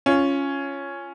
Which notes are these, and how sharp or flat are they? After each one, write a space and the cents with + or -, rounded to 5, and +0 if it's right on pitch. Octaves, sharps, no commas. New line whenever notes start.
C#4 +0 F4 -10